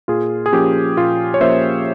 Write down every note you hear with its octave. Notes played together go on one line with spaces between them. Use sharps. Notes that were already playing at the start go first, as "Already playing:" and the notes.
A#2 F4 G#4
G#4
F3 A#3 C#4 G4
A#2 F4
C#5
F3 A#3 C#4 C5 E5